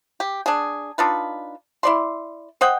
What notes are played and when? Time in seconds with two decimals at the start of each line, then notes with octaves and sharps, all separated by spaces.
0.20 G4
0.46 D4 G#4
0.98 D4 D#4 F4 B4
1.83 E4 D5 C6
2.61 C5 D#5 F#5 G5